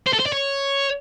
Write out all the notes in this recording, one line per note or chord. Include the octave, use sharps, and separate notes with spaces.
C5
A4
C5
D5
C#5